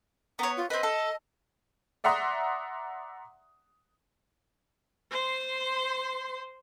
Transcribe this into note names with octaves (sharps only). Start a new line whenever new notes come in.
B3 C#5 A#5
F4
C4 B4 D#5
A4
D5 E5 F#5 A#5 C6 D#6
C5 C6